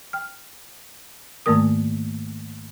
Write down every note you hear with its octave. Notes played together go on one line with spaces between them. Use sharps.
G5 F6
G#2 D#3 A3 A#3 A#4 D#6